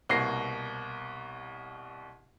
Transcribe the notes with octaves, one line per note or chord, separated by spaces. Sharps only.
C2 B2 A#3 A#6 C7